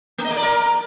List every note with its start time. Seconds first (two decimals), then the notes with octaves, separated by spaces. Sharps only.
0.18 A#3
0.24 D#5
0.30 A#3
0.36 D5
0.42 A#4